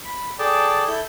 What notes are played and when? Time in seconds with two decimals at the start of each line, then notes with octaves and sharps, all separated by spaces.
0.05 B5
0.39 G#4 A4 D5 G5 A5
0.87 E4 A4 G6